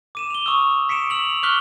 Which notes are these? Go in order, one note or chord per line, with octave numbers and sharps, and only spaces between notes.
D6 D#7 E7
F7 G7
C#6 D#6 E6
B6 C#7 D7 E7
E6 F7 F#7
C#6 D6 F6 F#6 B6 G7